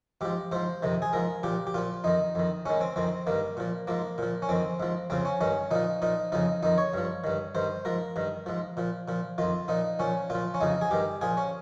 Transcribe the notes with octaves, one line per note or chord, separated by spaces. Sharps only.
G#2 F3 G4
G#2 F3 C5
F2 C3 D#3
G#4
G#2 F3 A#4
A#2 F3 G4
G4
A#2 F3 F4
F2 D#3 D#4
F2 D#3
G#2 D#3 C#4
C4
F2 D#3 C4
G2 D#3 A#3
A#2 F3
G#2 F3 A#3
A#2 F3
C#4
F2 D#3 C4
G#2 F3
F2 C#3 F3 C4
C#4
G2 D#3 C#4
A#2 F3 D#4
A#2 F3 D#4
F2 C#3 F3 D#4
F2 D#3 D#4
C#5
G2 F3
G2 D#3
G2 D#3 C5
G#2 F3 A#4
G2 D#3
G#2 F3
A#2 F3
A#2 F3
F2 D#3 F4
A#2 F3 D#4
A#2 F3 C#4
A#2 F3 F4
C#4
F2 C#3 F3 D#4
G#4
G2 D#3 G4
A#2 F3 G#4
C#4